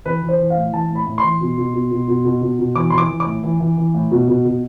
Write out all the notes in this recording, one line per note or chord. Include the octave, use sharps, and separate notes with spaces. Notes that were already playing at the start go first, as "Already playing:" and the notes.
E3 B4
E3
C5
E3
F5
A2
E3 A5
A2
B5
A2
C6
E3
B2
B2
B2
B2
B2
B2
B2
B2
E3 D6
E3 C6
D6
E3
D6
A2
E3
E3
E3
A2
B2
B2
B2